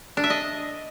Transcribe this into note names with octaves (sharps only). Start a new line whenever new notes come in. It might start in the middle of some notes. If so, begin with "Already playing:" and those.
D4
E5
D#5